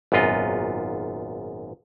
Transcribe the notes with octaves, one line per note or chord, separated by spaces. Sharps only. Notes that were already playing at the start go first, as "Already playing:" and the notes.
G#1 F#2 A#2 B3 F4 D#5